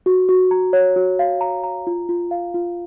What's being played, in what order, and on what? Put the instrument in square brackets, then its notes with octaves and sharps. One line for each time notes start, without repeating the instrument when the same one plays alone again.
[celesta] F#4
F#4
A#5
C#5
F#4
F5
A#5
A#5
F4
F4
F5
F4